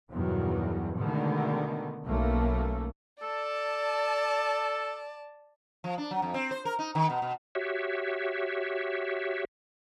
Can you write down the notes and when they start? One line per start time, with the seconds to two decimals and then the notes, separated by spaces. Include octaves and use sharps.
0.10 E2 G2 B2 D#3 F#3
0.98 B2 D3 D#3 G#3 A3 B3
2.05 B1 A3 A#3 C#4
3.23 A4 D5 A5
5.84 F3
5.98 D4
6.11 F#3
6.22 F2
6.34 C4
6.51 C5
6.65 A#4
6.79 D#4
6.95 D#3
7.10 B2
7.22 B2
7.55 F#4 G4 C#5 E5